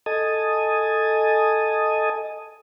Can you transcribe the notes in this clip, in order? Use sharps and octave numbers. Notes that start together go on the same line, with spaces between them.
A4 D#5 G#5 A5 D#6